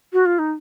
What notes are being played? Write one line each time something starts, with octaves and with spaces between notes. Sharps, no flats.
F#4
F4
D#4